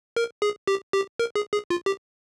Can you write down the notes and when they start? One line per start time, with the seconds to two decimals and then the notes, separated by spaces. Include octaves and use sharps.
0.16 A#4
0.42 G#4
0.67 G4
0.93 G4
1.19 A#4
1.35 G#4
1.53 G#4
1.70 F4
1.86 G4